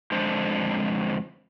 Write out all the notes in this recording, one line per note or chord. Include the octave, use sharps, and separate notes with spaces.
F2 D3 G#3 D4 C5